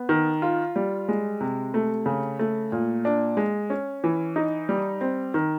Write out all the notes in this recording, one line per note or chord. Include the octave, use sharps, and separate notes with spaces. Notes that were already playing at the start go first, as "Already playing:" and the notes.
Already playing: B3
D#3
F4
G3
G#3
C3
A3
C#3
A3
A#2
D4
G#3
C#4
E3
D#4
G3
C4
D#3